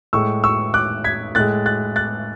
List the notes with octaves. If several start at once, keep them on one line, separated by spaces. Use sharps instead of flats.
A2 G#3 C#6 E6
C#6 E6
D6 F#6
G#6 B6
A2 G#3 F#6 A6
F#6 A6
F#6 A6